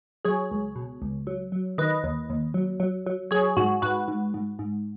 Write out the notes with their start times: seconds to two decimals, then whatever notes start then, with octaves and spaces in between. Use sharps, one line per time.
0.25 F#3 G#4 C#5
0.51 C#2
0.76 B2
1.02 C#2
1.27 F#3
1.52 F#3
1.78 D#3 B4 D#5
2.04 D#2
2.30 D#2
2.54 F#3
2.80 F#3
3.06 F#3
3.31 F#3 G#4 C#5
3.57 G#2 F#4
3.82 G#2 F#4 B4
4.08 G#2
4.34 G#2
4.59 G#2